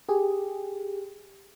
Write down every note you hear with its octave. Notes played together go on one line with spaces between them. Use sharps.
G4 G#4